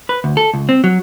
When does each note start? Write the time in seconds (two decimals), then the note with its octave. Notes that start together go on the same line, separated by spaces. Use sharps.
0.09 B4
0.24 D2
0.37 A4
0.54 C#2
0.69 C4
0.84 F#3